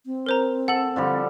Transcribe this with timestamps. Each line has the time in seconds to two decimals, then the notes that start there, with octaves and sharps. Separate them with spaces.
0.06 C4
0.26 A#4 C5 A#5
0.68 A4 F#5 F#7
0.96 D3 F3 G3